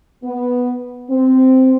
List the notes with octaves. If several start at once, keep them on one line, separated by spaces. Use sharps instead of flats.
B3
C4